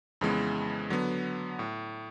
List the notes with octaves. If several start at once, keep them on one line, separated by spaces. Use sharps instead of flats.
F2 C#3 E3 G#3 B3
D3 F#3 B3
A2